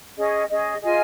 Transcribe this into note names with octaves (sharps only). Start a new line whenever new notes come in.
C#4 G#4 D#5
C#4 G#4 D#5
F4 G#4 D#5 G#5